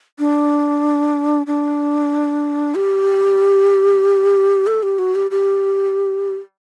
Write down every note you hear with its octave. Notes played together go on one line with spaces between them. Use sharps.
D4
D4
G4
A4
G4
F#4
G4
G4